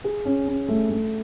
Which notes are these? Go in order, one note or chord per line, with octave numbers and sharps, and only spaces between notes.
G#4
C#4
C#4
A3
A3